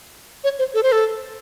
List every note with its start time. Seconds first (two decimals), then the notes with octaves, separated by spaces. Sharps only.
0.44 C#5
0.59 C5
0.74 A4
0.83 C5
0.92 A4